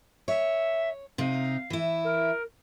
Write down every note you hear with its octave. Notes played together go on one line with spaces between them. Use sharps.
C#5 E5
C3 D#4 F5
E3 E4
A#4